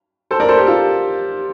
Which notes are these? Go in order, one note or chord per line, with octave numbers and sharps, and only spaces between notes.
A4 C5
A#4 D5
A4 C5
G4 A#4
F4 A4